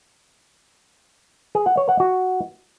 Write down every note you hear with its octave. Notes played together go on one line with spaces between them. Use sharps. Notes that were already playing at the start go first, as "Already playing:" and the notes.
G#4
F#5
C#5
F#5
F#4